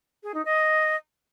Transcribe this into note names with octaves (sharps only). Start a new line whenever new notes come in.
G#4
D#4
D#5